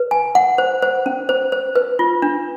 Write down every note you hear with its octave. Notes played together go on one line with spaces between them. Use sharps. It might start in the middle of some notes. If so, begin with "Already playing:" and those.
Already playing: B4
G#5
F#5
C5
C5
C#4
C5
C5
B4
F4
D4